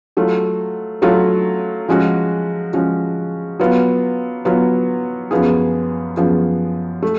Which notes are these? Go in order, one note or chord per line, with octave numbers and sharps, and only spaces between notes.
F#3 A3 F4
F#3 A3 F4
F3 G#3 C#4 F#4
F3 G#3 C#4 F#4
F#3 B3 F4
F#3 B3 F4
F#2 F3 B3 F4 G#4
F#2 F3 B3 F4 G#4
A3